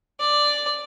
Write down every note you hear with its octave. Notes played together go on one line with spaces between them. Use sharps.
D5